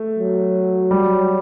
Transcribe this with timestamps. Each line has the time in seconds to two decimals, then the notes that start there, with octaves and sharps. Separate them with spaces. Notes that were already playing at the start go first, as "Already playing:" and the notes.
Already playing: A3
0.19 F#3
0.91 G3